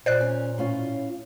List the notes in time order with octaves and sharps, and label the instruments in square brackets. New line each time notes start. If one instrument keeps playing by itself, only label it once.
[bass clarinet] A#2 [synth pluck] C5 D5 F#6
[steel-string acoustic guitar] C#4
A2 C#4 F4